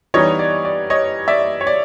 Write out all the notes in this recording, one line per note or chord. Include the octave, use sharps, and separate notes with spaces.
E3 G3 B3 D#4 C#5 D#5
D5
D5
C#5 D#5
D5 E5
C#5
D5